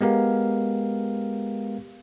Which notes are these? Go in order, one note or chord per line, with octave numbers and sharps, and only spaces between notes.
G#3 B3 G4 A#4 F5